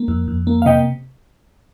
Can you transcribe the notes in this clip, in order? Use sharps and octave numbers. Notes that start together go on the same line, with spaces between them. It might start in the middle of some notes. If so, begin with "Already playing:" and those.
Already playing: A#3
F2
F2
A#3
F5
C3 D#5 G5